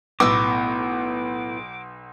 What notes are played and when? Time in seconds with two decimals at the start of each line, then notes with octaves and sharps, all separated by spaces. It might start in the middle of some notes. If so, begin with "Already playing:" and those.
0.20 B1 A2 B3 D6 E6